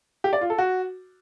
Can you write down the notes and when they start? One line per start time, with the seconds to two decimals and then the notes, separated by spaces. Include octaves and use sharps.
0.24 G4
0.33 D5
0.41 F4
0.50 A4
0.58 F#4